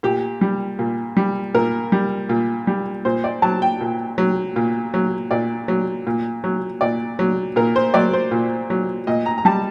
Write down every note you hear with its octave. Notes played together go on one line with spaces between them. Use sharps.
A#2 G4
G3
A#2
G3
A#2 A#4
G3
A#2
G3
A#2 C5
D5
F#3 A5
G5
A#2
F#3
A#2
F#3
A#2 D5
F#3
A#2
F#3
A#2 D5
F#3
A#2 A#4
C5
F#3 D5
C5
A#2
F#3
A#2 D#5
A#5
A#5
G3 A5